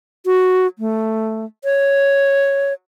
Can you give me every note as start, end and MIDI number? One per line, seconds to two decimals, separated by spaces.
0.26 0.67 66
0.79 1.45 57
1.64 2.73 73